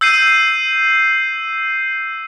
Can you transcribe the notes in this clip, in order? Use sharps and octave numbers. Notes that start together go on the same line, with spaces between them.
E6 G6 C7 D#7